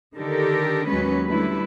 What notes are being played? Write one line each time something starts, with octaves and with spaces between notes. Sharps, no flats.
D3 D#3 G4 A4 A#4
D#2 F#3 G#3 B3 C#4 B4
D3 G3 A3 E4 B4